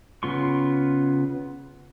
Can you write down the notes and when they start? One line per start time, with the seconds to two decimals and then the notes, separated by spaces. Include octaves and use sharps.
0.23 C#3 B3 F4 C6 C#6